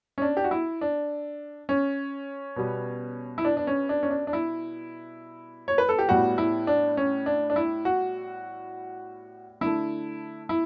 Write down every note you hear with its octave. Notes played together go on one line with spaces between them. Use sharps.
C#4
D4
G4
F#4
E4
D4
C#4
B2 G3 B3
E4
D4
D4
C#4
D4
C#4
D4
D4
E4
C#5
B4
A4
G4
A2 G3 B3 F#4
E4
D4
C#4
D4
D4
E4
F#4
D3 A3 E4
E4